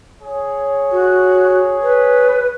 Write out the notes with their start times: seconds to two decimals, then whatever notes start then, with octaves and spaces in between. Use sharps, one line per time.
0.22 G#4 C#5
0.92 F#4
1.83 B4